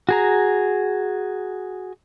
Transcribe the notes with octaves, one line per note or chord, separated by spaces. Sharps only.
F#4 G#4 A#5